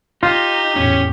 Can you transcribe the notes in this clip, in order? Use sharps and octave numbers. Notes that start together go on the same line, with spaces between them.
D#4 F4 G4
E2 A2 C#4